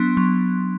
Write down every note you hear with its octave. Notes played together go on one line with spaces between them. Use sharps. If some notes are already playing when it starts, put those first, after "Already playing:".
Already playing: F#3 B3 D4 C6
F#3